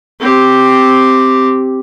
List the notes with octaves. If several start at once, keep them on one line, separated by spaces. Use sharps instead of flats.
C4 G4